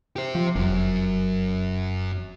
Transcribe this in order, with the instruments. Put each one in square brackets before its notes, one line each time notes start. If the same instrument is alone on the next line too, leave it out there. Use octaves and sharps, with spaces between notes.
[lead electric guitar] G4 C5
[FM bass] F3
[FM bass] F1 [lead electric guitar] F#2 F#3